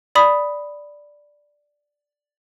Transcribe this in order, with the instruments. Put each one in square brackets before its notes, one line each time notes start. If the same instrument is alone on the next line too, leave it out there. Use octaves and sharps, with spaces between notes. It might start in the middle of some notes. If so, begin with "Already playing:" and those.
[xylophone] D5 B5 D#6 B6